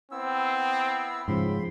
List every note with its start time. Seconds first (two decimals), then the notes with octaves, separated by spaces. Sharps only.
0.11 B3 C4 E4 E6
1.28 G#2 C#3 F3 B5 C6